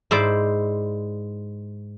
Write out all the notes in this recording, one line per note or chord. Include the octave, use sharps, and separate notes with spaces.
G#2 E4 C5 D5